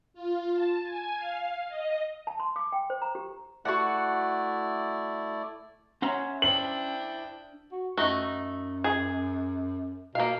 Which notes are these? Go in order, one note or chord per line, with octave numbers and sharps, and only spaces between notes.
F4
A5
G#5
F5
D#5
A5
C6
D6
G5
C5
A#5
G4
A3 E4 F#4 D5 F#5
C#4 C#5 E5 F#5 A#5 C6
D4 E4 C5 G5 F#7
F#4
F#2 A3 D#4 F#4
G#4
B2 A#3 F5